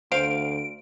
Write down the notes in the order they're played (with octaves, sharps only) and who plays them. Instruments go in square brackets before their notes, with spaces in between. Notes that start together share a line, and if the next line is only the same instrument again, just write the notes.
[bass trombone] D2 [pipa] C5 F5 [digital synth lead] D7